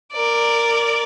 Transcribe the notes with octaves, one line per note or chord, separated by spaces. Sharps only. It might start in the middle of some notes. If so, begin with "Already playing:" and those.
A#4 D5